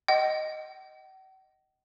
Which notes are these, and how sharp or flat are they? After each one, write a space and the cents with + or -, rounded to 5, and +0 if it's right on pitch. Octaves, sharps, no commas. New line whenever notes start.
D#5 +0 F#5 +45